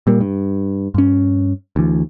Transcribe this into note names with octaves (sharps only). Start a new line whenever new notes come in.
A#2 G3 A#3
G2
G2 C#4
D2 E3